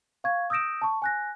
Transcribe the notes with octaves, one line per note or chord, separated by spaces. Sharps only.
F5 C#6 G#6
D#6 E6 G6 A#6 D7 E7
A5 C#6
G#5 F#6 A#6